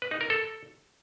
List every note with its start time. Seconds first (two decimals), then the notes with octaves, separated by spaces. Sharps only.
0.02 B4
0.11 D#4
0.21 A#4
0.30 A4